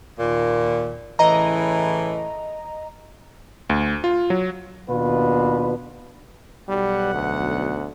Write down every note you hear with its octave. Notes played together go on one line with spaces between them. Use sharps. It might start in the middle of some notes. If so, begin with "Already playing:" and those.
D#2 A#2
A2 C#3 E3 D#5 A#5
D2
F4
F#3
D#2 B2 D4 F4 B4
B1 G3 F#5
D2